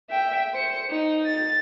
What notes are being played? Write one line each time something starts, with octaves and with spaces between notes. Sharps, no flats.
E5 G5
C5 C#7
D#4
A6